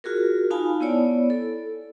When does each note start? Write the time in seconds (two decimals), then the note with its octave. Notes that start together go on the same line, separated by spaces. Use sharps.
0.04 F4 F#4 G#4 A#4
0.51 D#4 F4 F5 G#5 A5 B5
0.81 B3 E4 C#5 D5
1.30 A4